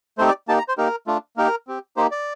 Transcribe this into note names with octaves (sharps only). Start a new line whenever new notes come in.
A3 C4 D#4 G4 C5
D5
A#3 D#4 G4 A5
A#5
C5
A#3 D#4 G4 A#4
A3 D4 F4
A#3 D#4 G4 A#4
C4 G4
A#3 D#4 G4 C5
D5